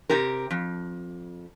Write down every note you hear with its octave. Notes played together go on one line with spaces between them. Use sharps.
C3 G4 A#4
F2